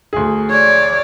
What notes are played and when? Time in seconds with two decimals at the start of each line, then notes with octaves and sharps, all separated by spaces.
0.13 D2 G#4
0.50 C#5 D5